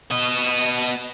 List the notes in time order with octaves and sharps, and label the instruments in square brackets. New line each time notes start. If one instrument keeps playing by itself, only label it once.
[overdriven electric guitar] B3 D#5